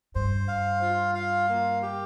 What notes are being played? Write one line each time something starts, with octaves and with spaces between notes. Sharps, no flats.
G2 C5
F5
F4
F5
A#3
G4